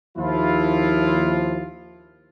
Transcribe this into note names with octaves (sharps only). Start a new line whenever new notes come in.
D#2 F3 E4 F4